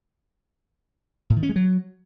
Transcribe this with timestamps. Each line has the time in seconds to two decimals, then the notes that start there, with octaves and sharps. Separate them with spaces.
1.30 A2
1.36 D#3
1.43 C#4
1.49 G#3
1.56 F#3